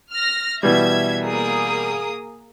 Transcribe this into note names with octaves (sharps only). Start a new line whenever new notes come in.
F6 A#6
B2 E3 G3 E5 G#6
A#3 G#4 D#6